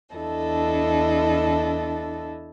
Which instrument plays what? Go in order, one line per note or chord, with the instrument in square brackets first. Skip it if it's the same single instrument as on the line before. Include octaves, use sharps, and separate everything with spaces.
[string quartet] E2 D4 E4 A4 D#5